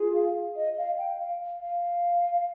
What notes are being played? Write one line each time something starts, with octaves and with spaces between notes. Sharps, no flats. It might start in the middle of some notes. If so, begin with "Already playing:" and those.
Already playing: F4 G#4
F5
D#5
F5
G5
F5
F5